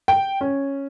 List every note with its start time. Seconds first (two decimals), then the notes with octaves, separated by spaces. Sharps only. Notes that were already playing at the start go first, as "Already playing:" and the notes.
0.08 G5
0.41 C#4